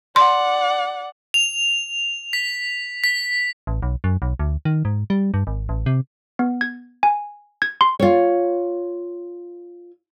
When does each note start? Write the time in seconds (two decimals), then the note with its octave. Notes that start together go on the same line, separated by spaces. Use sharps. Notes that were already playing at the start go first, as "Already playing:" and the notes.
0.16 D5 F#5 C6
1.34 F7
2.33 B6
3.04 B6
3.67 A1
3.82 B1
4.04 F#2
4.22 B1
4.39 D2
4.65 D#3
4.85 G#2
5.10 G3
5.34 G2
5.47 G#1
5.69 A1
5.86 C3
6.39 B3
6.61 G#6
7.03 G#5
7.62 G#6
7.81 C6
8.00 F4 C#5